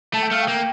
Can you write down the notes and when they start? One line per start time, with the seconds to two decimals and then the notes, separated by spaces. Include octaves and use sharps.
0.14 A3 A5
0.23 G5
0.31 A3 F5
0.43 G5
0.48 A#3